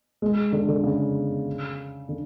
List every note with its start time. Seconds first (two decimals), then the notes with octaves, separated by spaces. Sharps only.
0.22 G#3
0.52 D3
0.68 D3
0.84 C#3
2.09 D3